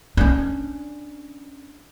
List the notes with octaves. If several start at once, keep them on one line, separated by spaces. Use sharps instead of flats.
C#4 D4